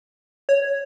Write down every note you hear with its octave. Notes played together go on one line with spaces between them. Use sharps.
C#5